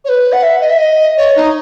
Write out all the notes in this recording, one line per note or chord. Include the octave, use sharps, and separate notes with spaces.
C#5
B4
F#5
E5
D#5
E5
D#5
C#5
D#4